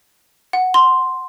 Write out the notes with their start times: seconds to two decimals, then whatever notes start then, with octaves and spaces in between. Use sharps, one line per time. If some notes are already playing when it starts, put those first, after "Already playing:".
0.53 F#5
0.74 C6